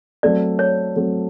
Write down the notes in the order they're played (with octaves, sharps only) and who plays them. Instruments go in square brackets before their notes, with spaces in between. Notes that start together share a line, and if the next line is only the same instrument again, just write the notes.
[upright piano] F#3 A3 C4 [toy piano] D5
[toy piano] C#5
[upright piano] F#3 A3 C4